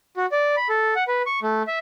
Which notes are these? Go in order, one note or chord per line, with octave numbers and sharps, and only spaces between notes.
F#4
D5
B5
A4
F#5
B4
C#6
A3
E5